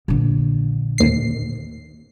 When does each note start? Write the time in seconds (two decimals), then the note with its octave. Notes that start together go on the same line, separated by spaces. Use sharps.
0.08 A#1 D3
0.98 A1 D#2 C7